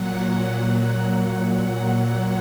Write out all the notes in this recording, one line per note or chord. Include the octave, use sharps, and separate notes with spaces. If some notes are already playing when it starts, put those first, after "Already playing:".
Already playing: A#2 F#3 F#5
F#5